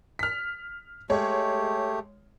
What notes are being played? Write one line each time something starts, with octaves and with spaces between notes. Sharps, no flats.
F6 B6
G#3 A3 G4 C#5